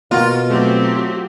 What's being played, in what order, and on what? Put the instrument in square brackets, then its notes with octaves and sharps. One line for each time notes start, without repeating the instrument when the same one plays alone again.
[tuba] B2 [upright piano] A#3 F#4 [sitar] F4
[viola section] F#3 C4 G4 [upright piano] A3